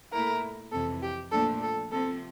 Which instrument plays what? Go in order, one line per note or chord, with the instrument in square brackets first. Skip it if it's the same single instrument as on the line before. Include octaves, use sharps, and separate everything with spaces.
[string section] A#2 A3 E4 [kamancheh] A#4
[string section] F2 C3 E3 [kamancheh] A4
[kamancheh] G4
[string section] A#2 F3 A3 D4 [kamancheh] A4
[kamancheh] A4
[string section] C3 F3 C4 [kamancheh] A4